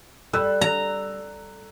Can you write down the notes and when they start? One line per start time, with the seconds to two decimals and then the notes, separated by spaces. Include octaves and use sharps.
0.33 G3 A4 E6 F#6
0.61 A#5